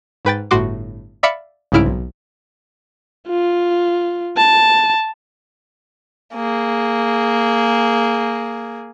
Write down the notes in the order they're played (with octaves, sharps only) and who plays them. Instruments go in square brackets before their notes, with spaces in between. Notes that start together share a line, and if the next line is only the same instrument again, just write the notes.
[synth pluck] G#2 B4 G5 A6
G1 A2 F#4 C6 D6
D5 E5 F5 B5 D6 C#7
C2 G#2 C#3 E4 F6 D7
B1
[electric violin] F4
A5
[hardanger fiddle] A#3 G#4